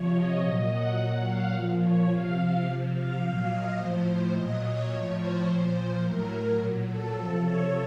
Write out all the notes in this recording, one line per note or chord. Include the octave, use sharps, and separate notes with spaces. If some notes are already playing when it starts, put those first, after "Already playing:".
Already playing: C3 F3 C#5
D#5
A#2 F#3
F#5
A#2 F#3
F5
A#2 F3
C#5
C3 F3 F5
C3 F3
F5
A#2 F#3 F5
D#5
A2 F3 C5
A#2 F#3 D#5
C#5
A2 F3 C#5
C5
A#2 F3
C5
A2 F#3 A#4
A#2 F#3
A4
C3 F3
C#5